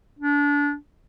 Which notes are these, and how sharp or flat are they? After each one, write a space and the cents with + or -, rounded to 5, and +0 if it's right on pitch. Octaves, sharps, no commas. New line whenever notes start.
D4 -25